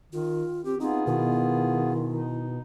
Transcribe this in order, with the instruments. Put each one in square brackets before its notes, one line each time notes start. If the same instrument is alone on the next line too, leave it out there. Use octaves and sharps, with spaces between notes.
[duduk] D#3 [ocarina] F4
[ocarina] C4 [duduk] G4
[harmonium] B3 F4 G#4 [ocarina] C4 [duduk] D#4
[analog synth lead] B2 [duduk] D#3 [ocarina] E4
[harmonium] D#4